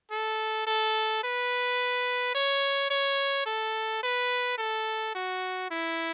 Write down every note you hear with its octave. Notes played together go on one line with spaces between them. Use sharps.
A4
A4
B4
C#5
C#5
A4
B4
A4
F#4
E4